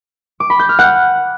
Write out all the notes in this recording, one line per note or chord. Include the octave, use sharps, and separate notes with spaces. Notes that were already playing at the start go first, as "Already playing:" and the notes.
D6
B5
G6
F6
F#5